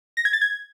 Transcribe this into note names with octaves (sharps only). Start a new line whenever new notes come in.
A#6
G#6
A6
G#6